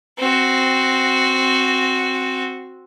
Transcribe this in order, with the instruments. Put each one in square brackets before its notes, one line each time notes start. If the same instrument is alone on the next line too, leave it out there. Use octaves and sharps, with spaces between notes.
[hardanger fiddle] C4 F#4